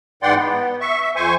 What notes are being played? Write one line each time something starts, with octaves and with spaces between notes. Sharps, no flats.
G#2 E3 D5 F#5 G5 C6
B3
E5 C#6
E5
F2 C5 G#5 C#6